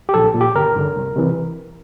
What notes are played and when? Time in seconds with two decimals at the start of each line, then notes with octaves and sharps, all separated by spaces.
0.09 G4
0.14 A#1 A4
0.34 A#2
0.41 G4
0.55 G1 A#4
0.76 G2 D3
0.96 C2
1.16 C3 E3